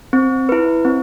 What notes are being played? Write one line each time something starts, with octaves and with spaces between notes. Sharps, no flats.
C4
E4 B4
C4